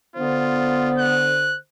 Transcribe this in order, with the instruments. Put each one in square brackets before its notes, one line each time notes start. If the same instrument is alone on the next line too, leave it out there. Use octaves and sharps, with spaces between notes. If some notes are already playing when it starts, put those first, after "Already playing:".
[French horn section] D3 C5 [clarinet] B3 [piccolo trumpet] F4
[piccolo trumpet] F#6